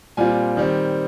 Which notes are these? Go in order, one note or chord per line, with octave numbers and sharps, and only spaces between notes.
A#2 G3 C4 F4 G#5
D#3 G3 C4